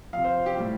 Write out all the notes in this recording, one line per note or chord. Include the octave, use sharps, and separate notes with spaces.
C3 F3 F5
C5
G4
A2 G3